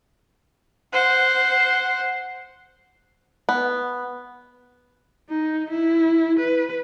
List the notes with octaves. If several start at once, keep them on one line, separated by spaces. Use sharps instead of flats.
C5 F#5
B3
D#4
E4
B4